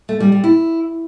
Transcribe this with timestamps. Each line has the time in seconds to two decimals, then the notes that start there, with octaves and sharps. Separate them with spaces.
0.09 A3
0.20 G3
0.32 G3
0.44 E4